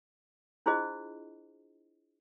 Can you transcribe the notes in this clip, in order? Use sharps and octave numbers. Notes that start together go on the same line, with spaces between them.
D4 E4 F4 G#4 C5 D#5